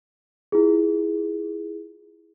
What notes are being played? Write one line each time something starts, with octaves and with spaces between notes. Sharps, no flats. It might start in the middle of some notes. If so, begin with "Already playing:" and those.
E4 F4 G#4